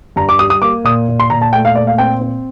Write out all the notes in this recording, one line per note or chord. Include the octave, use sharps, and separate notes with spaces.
G2 A#5
D6
G3 D#6
D#6
A#3 D6
A#2 D#6
A#2
C6
A#2 A#5
A5
A3 G5
F5
A#2 D5
F5
C4 G5
C4